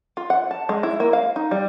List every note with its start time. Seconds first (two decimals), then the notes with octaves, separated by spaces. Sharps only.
0.17 F4
0.30 F#5
0.51 A5
0.69 G#3
0.83 E4
1.00 A#3
1.13 F5
1.36 D#4
1.51 G3